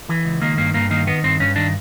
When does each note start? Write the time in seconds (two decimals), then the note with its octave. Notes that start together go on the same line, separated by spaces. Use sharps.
0.09 E3
0.25 C#2
0.41 D#3 A#3
0.58 G2 A#3
0.74 G2 A#3
0.91 D#3 A#3
1.07 D#3 B3
1.23 G2 C4
1.40 G2 C#4
1.56 D#3 D4